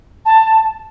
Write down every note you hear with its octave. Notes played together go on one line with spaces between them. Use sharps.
A5